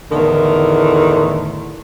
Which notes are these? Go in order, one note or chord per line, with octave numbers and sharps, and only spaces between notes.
E2 A2 D3 D#3